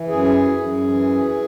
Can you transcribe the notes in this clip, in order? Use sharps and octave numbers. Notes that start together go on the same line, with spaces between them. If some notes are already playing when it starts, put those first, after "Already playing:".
Already playing: E3
F#2 G#4
F#2
E3